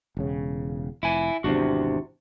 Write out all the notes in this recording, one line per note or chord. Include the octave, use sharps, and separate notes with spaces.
E1 C#3
F1 E4 G#5
G#1 E2 C3 D4 F#4